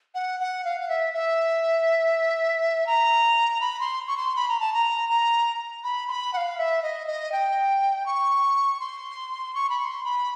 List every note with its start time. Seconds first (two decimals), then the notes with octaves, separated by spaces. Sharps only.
0.15 F#5
0.40 F#5
0.65 F5
0.81 F5
0.89 E5
1.14 E5
2.87 A#5
3.61 B5
3.80 C6
4.08 C#6
4.17 C6
4.36 B5
4.48 A#5
4.60 A5
4.74 A#5
5.09 A#5
5.84 B5
6.08 C6
6.11 B5
6.33 F#5
6.37 F5
6.58 E5
6.83 D#5
7.07 D#5
7.32 G5
8.06 C#6
8.80 C6
9.55 C#6
9.70 B5
9.80 C#6
9.85 C6
10.04 B5